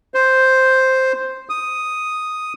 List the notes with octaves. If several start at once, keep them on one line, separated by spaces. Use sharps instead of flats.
C5
D#6